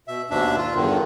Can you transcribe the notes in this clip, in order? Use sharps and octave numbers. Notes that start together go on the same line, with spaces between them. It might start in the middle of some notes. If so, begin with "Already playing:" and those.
B2 E5
D#2 G#2 B2 D4 E5
F4
E2 G2 D3 D#3